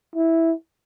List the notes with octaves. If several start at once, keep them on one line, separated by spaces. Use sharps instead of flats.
E4